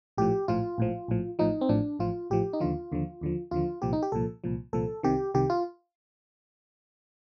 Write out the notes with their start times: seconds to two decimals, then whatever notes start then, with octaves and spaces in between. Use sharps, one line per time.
0.18 A#1 A2 F3 G4
0.48 A#1 A2 F3 F4
0.78 A#1 A2 F3
1.08 A#1 A2 F3
1.39 A1 A2 F3 D#4
1.61 C4
1.69 A1 A2 F3 D4
1.99 A1 A2 F3 F4
2.30 A1 A2 F3 G4
2.53 D#4
2.60 D#2 D3 F3 F4
2.92 D#2 D3 F3
3.21 D#2 D3 F3
3.51 D#2 D3 F3 F4
3.82 C2 A#2 F3 G4
3.93 D#4
4.02 G4
4.12 C2 A#2 F3 A4
4.44 C2 A#2 F3
4.73 C2 A#2 F3 A4
5.03 C2 C3 D#3 G4
5.34 C2 C3 D#3 G4
5.50 F4